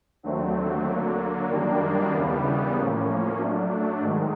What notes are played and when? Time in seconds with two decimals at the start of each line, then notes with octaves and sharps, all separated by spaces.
0.23 D#2 D3 F#3 A3 C4
0.86 D3 F#3 A#3
1.49 F#2 D#3 G3 A#3 D4
2.12 D#2 C#3 E3 G3 B3
2.75 A2 F3 A#3 C#4
3.37 F#3 A3 D4
4.01 G#2 D#3 G#3